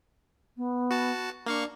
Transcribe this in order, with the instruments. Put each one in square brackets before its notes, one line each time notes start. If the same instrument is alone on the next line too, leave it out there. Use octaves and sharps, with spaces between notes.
[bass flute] B3
[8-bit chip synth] F#4 A5
[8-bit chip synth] A#3 F5 C#6 [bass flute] D4